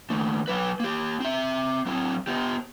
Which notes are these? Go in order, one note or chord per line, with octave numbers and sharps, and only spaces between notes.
D#2 A3
F#3 B4
A#3 G4
C4 E5
F#3 C4
B3 G4